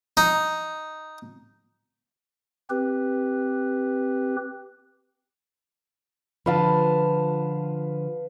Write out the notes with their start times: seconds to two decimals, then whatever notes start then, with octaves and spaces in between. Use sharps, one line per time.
0.17 D#4
2.70 C4 G4 B4
6.46 D3 F3 B4 F5 A5